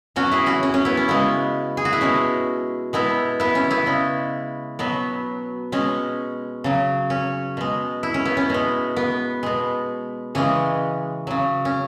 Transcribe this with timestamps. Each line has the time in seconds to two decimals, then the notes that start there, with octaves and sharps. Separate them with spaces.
0.16 B2 F#3 C#4 F#4
0.32 E4 G#4
0.46 C#4 F#4
0.63 C#4
0.74 C#4
0.85 B3 E4
0.97 C#4
1.08 C#3 G#3 B3
1.77 G#4
1.85 F#4
1.93 E4
2.01 B2 G#3 C#4
2.93 B2 G#3 B3 E4
3.40 B3 E4
3.55 C#4
3.71 B3 E4
3.86 C#3 G#3
4.79 B2 F#3 B3
5.72 B2 G#3 C#4
6.64 C#3 F#3
7.10 C#4
7.57 B2 G#3
8.03 E4
8.14 C#4
8.25 B3
8.37 C#4
8.50 B2 G#3
8.97 B3
9.43 B2 G#3
10.35 C#3 E3 G#3 C#4
11.27 C#3 F#3
11.65 C#4